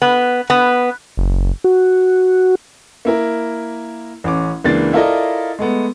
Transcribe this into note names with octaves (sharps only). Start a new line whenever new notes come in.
B3
B3
F#1
F#4
A#3 E4 A#4
A1 C#4 D6
C#2 E3 A#3 D4 A6 C7
E4 F4 A4 A#4 D5 D#5
G#3 A3 B3